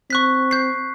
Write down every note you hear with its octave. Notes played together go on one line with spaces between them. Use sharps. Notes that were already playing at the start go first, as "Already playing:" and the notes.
C4 C#6 F#6 B6
G6 C7